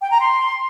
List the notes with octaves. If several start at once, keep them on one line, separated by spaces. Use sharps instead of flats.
G5
A#5
C6